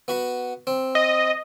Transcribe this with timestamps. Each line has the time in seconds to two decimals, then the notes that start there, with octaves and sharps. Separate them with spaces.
0.08 B3 F#4 B5
0.67 C4
0.95 D#5